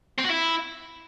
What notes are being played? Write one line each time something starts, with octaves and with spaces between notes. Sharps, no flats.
C4
F#4
E4